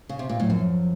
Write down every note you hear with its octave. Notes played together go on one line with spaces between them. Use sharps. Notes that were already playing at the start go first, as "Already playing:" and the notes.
C#3
C3
A#2
A2 F#3
F#2 F3